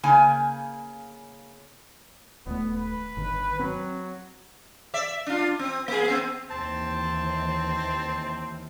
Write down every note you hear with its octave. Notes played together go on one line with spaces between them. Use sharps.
C#3 A#3 G#5
D#1 A3 B3
B4
G1 D#3
F#3 C4
D5 E5
D4 F4
C4
A#3 G#4
B3 C4
D#2 E3 C4 A5